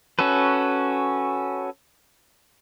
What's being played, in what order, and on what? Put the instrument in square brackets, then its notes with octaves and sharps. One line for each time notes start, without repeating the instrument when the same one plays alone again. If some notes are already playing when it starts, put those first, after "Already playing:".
[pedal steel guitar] C#4 F#4 A4 B4